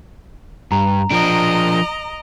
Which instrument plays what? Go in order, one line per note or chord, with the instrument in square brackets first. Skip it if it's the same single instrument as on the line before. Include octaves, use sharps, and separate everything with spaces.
[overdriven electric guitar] G2 [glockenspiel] A#5
[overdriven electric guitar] F3 D4 [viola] D#5 A#5 [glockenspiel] D7